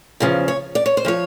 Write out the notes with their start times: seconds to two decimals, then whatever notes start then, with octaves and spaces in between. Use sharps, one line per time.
0.20 E2 C#3 F3
0.48 C#5
0.75 D5
0.86 C#5
0.97 C5
1.05 C#3 F3 C#5